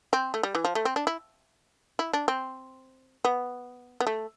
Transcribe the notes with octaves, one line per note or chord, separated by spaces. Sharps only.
C4
A3
G3
E3
F3
A3
C4
D4
E4
E4
D4
C4
B3
B3
A3